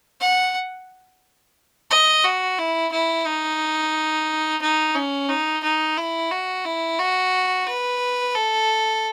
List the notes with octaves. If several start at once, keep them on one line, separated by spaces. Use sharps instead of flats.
F#5
D#5
F#4
E4
E4
D#4
D#4
C#4
D#4
D#4
E4
F#4
E4
F#4
B4
A4